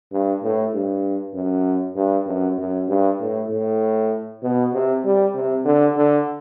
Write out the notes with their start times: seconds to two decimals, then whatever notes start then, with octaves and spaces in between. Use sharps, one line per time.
0.12 G2
0.43 A2
0.73 G2
1.35 F#2
1.96 G2
2.27 F#2
2.58 F#2
2.89 G2
3.20 A2
3.50 A2
4.43 B2
4.73 C3
5.05 G3
5.35 C3
5.65 D3
5.97 D3